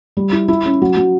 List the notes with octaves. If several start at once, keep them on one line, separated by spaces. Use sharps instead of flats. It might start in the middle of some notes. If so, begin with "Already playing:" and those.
G3
E4
E4
C#4
F#3
F#3